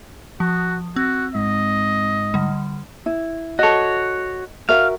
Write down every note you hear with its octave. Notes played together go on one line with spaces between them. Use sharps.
F3 F#4
C4 F#4
G#2 D#5
D3 G3
E4
F#4 A4 C#5 D#5
F#4 A#4 E5 F5